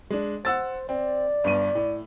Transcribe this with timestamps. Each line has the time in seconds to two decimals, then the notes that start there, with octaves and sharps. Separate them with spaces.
0.10 G#3 D4
0.45 C5 F#5 E6 A6
0.89 C4 D5
1.44 G1 G2 D#7
1.75 A2